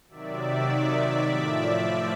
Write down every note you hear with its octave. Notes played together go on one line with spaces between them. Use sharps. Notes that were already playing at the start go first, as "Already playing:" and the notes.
C3 D#3 F#3 D5 E5
A2 F3 D5 E5
D5 E5